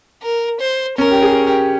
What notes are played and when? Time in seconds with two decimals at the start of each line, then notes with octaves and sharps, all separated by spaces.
0.22 A#4
0.60 C5
0.98 C#4 A#4
1.11 G4
1.22 G#4
1.47 G4